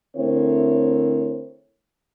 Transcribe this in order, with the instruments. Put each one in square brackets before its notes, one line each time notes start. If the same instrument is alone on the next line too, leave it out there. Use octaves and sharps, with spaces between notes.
[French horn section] D3 A3 C4 E4 A#4 C#5